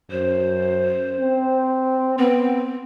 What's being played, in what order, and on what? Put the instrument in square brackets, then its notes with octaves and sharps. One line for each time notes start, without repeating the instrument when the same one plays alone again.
[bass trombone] F#2 [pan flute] C5
[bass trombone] C4
[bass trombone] B3 [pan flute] C4